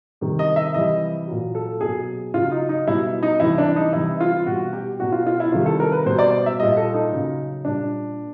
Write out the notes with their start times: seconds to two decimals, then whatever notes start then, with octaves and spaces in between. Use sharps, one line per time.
0.21 C3 D#3 G3
0.39 D#5
0.56 E5
0.74 C3 E3 G3 D#5
1.27 A#2 F#3
1.55 A4
1.81 B2 F#3 G#4
2.34 C#3 F#3 F4
2.52 D#4
2.69 D#4
2.87 B2 G3 E4
3.23 D#4
3.40 C3 E3 G3 E4
3.58 D4
3.76 D#4
3.93 C3 E3 G3 E4
4.20 F4
4.46 B2 G3 F#4
4.73 G4
4.99 B2 F#3 F#4
5.12 F4
5.26 F4
5.40 E4
5.52 C3 D#3 G3 F4
5.66 A4
5.80 A#4
5.92 B4
6.05 B2 G3 C5
6.19 D5
6.46 E5
6.59 A#2 G3 D#5
6.77 A4
6.94 D#4
7.13 C#3 F#3
7.65 A#2 G3 D4